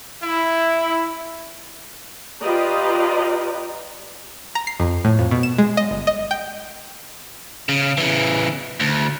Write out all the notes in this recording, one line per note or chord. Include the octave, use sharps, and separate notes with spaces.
E4
F4 G4 B4 D5 D#5 A#5
A#5
C7
F2
A2
F2
B2
E7
G#3
D#5
G1
D#5
G5
C#3
C#3 E3
D2